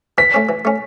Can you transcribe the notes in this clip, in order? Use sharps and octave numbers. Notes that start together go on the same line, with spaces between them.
E3 B6
A3 C#4
E3
A3 C#4